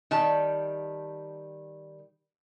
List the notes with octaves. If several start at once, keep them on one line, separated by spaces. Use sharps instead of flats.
D#3 G3 A5